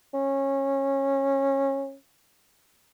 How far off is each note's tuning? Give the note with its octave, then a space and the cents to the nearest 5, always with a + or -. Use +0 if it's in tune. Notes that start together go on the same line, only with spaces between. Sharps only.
C#4 -20